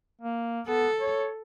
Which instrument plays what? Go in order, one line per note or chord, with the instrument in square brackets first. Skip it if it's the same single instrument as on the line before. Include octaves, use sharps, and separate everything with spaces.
[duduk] A#3
[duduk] B3 [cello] A4
[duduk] C#5